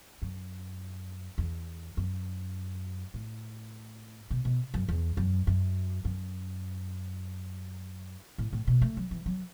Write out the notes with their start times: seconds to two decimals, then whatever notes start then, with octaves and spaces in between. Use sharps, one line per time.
0.22 F#2
1.38 E2
1.97 F#2
3.14 A2
4.31 B2
4.45 B2
4.74 F#2
4.89 E2
5.17 F#2
5.47 F#2
6.05 F#2
8.38 A2
8.53 A2
8.67 B2
8.82 A3
8.97 F#3
9.11 E3
9.26 F#3